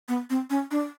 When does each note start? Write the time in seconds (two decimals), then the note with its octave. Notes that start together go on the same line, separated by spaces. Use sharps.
0.08 B3
0.30 C4
0.50 C#4
0.71 D4